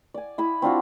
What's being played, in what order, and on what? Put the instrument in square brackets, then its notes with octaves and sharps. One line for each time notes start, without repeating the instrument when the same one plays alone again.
[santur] D5 G#5
E4 B5 D#6
C4 D4 F4 F#4